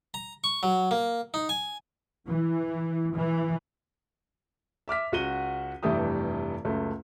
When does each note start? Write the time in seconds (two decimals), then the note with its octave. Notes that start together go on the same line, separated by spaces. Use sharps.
0.14 A#5
0.44 C#6
0.63 F#3
0.91 A#3
1.34 D#4
1.49 G#5
2.29 E3
3.17 E3
4.88 E5 D6 F6 B6
5.12 C#2 F#4 F#5 D#7 G7
5.83 F1 G2 E3 A3 G4 D#6
6.65 C#2 F#2 A3